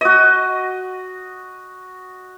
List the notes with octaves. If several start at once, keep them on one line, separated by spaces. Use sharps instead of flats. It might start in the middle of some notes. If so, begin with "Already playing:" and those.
F#4 D#5